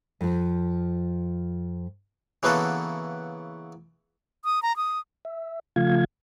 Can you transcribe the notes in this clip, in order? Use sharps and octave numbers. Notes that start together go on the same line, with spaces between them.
F2 F3
C#3 E3 A#3 B3 F#4 A4
D#6
A#5
D#6
E5
C#3 F3 A3 F4 F5 G#6